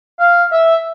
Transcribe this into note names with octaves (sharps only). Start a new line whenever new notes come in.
F5
E5